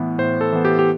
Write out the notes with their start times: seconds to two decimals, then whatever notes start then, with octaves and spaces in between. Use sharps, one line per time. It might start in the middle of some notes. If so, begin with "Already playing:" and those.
Already playing: A2 E3 B3
0.18 A2 C5
0.41 A4
0.52 E3 B3
0.65 G4
0.79 G4